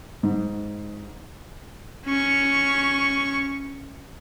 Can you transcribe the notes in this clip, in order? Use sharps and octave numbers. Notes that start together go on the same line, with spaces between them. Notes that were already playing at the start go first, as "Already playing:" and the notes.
G#2
C#4 C#6